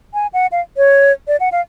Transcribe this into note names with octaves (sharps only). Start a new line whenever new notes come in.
G#5
F#5
F5
C#5
D5
F#5
F5